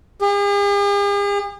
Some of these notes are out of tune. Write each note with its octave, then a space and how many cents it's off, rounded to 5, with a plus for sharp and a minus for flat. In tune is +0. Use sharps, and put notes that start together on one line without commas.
G#4 -45